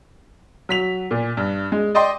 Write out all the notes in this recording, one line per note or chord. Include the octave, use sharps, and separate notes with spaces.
F#3 B6 F7
A#2
G2
G#3
D5 D#5 G5 C6